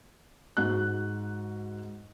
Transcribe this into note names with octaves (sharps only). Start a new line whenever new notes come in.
G#2 F#4 F#6